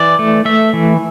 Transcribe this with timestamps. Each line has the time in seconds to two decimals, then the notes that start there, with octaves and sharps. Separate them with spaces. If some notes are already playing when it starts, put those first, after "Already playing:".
Already playing: E3 D5
0.19 A3
0.45 A3 E5
0.73 E3